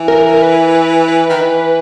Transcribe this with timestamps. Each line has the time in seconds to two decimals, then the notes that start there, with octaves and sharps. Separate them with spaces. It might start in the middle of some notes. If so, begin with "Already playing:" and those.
Already playing: E3
0.08 A#4
0.34 A#4
0.42 B4
0.75 B4
1.08 B4
1.29 D#3
1.41 E3